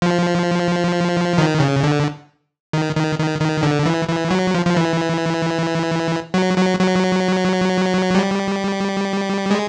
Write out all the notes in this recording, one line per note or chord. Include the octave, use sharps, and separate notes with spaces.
F3
D#3
C#3
D3
D#3
D#3
D#3
D#3
D3
E3
E3
F#3
F3
F3
E3
F#3
F#3
F#3
G3
G#3